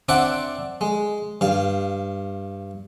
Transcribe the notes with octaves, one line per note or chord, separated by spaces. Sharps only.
C4 D4 D5 E5 F#5
G#3
G2 F5